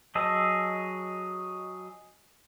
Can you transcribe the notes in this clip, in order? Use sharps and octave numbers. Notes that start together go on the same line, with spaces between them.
F#3 G#4 D#5 A5 E6